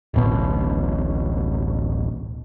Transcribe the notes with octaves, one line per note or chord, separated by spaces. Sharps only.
D1 A1 B2